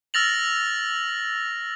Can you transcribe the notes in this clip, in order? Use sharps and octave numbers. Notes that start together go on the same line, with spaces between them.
E6 F6 A6 A#6 F7 F#7